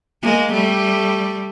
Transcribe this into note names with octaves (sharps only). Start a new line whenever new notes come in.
G#3 A#3
G3 A3